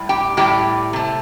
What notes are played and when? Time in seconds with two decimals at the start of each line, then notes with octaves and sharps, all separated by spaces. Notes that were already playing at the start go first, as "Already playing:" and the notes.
Already playing: A2 G3
0.09 G4 G5
0.37 A2 G3 G4 G5
0.93 C3 A3